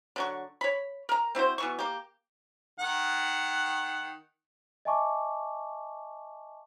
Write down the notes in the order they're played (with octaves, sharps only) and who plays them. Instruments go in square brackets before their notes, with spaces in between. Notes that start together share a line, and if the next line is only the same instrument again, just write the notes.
[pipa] D3 F#3 C#6
C#5 B5
A#4 A#5
C4 E4 F#4 C5
B2 E3 C#6
A#3 G4
[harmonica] D#3 F#5
[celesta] D#5 E5 G#5 A5 C#6 D6